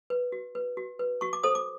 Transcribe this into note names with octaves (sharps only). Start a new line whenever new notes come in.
B4
F#4
B4
F#4
B4
F#4 C#6
D6
A4 C5 D#6
D6